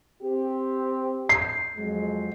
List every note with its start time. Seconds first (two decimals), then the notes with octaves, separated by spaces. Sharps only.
0.22 C4 G4
1.29 C7
1.76 F2 F#3 G#3